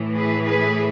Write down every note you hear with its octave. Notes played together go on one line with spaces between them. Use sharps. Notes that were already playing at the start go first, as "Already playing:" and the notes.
Already playing: A2 E3
G#4 B4
G#4 B4